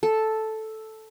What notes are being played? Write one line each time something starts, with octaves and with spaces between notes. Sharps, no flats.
A4